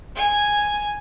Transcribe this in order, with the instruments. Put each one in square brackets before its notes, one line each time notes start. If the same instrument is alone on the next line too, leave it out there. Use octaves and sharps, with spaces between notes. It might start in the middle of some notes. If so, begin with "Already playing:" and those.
[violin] G#5